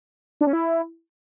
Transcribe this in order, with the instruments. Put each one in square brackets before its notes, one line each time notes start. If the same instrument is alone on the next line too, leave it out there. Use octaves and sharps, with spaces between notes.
[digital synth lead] D4
C#4
E4